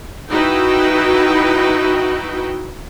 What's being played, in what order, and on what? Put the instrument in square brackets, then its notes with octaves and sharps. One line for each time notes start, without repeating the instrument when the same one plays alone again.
[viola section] D#4 E4 F#4 B4 G5